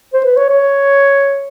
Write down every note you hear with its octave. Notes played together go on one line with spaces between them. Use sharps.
C5
B4
C#5
C#5